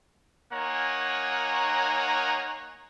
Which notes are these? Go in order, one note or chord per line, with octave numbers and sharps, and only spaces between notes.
A#3 D#4 C#5 F#5 G#5 A#5